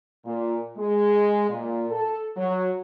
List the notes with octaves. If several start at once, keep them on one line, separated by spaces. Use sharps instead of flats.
A#2
G#3
A#2
A4
F#3